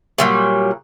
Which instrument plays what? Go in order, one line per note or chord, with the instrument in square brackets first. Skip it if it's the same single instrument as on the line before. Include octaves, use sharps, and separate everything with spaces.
[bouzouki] A#2 F#3 G3